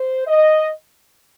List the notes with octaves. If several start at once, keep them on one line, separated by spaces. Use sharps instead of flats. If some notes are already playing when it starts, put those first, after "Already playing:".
Already playing: C5
D#5